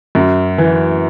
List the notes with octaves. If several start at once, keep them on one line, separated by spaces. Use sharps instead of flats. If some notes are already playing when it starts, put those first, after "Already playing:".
F#2
E3